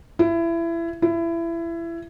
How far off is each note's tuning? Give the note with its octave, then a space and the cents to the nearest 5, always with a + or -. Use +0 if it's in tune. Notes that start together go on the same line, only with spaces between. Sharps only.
E4 +25
E4 +25